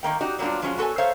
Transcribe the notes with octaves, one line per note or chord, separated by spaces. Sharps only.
D#3 G3 A#3 G5
D#4 F#4 G4 D5
F#3 G3 A#3 B3 D4 F4
F3 F#3 G#3 C#4 F4
B3 F#4 A4 B4 C#5 G#5
A4 A#4 C5 C#5 E5 F5